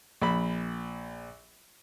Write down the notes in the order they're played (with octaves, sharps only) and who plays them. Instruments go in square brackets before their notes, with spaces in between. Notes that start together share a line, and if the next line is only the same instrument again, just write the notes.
[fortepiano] A#1 B5